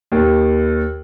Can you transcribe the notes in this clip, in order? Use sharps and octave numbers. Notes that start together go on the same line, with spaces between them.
D#2